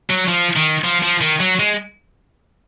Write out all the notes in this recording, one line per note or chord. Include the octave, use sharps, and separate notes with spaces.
F#3
F3
D#3
F3
F3
D#3
F#3
G#3